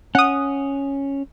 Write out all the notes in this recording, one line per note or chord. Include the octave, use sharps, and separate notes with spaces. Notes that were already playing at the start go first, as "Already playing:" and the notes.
C#4 F#5 D#6